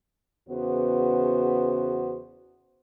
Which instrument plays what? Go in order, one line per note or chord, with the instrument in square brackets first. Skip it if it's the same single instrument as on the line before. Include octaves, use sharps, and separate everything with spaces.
[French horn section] E2 C#3 B3 F#4 C5